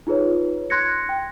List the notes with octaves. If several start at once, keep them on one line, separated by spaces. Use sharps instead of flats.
D#4 F4 G#4 B4 C#5
C6 F#6 G#6 A#6 C#7
G5